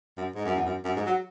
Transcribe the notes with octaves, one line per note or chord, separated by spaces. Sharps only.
F#2
G#2
F#2
E2
F#2
F#2
G#2
F#3